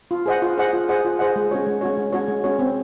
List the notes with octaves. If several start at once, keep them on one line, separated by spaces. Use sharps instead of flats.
F4
G#4 C5 D#5 F#5
F4
G#4 C5 D#5 F#5
F4
G#4 C5 D#5 F#5
F4
G#4 C5 D#5 F#5
G#3
C#4 F#4 C#5
G#3
C#4 F#4 C#5
G#3
C#4 F#4 C#5
G#3
C#4 F#4 C#5
C4